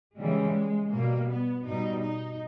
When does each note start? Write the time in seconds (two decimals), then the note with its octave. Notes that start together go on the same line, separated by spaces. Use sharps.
0.18 C#3 E3 G3 G#3
0.92 B2 G3 A#3
1.28 B3
1.65 B2 G3 D#4
2.02 D#4